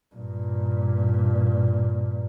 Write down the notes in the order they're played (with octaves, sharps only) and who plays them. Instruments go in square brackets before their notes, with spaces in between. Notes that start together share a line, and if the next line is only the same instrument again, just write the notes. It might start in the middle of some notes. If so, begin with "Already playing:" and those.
[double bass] G2 A#2